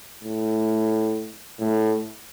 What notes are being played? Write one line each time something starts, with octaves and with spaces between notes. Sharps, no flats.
A2
A2